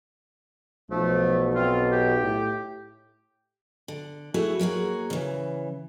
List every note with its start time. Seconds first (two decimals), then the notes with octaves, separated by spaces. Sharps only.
0.90 B1 F3 A3
1.56 C4 F4
1.92 G4
2.23 A2
3.88 D3
4.34 A3 E4 F#4 G#4 F#5
4.59 F#3 A#3 F#4 G#4
5.10 C#3 E3